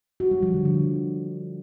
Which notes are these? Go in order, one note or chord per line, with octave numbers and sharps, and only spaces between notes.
F#4
G3
F3
D3
D3